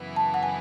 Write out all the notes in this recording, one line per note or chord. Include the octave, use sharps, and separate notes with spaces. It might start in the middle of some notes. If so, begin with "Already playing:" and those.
Already playing: F#2 C#3 E3 B3 E4
A5
F#5
G#5